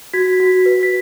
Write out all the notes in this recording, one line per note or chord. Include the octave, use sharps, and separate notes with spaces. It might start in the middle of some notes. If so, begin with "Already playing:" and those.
F#4 G#6 B6
F#4
B4
B6